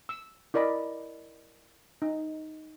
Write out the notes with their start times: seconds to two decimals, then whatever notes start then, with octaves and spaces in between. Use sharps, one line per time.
0.09 E6
0.54 E4 A#4 D5 D#5 B5
2.02 D#4